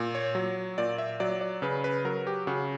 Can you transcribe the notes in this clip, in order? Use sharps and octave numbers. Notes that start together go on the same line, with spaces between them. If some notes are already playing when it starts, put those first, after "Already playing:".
Already playing: A#2
C#5
F#3
A#2 D5
E5
F#3 D5
D5
C#3 B4
B4
F#3 A#4
G4
C#3 F#4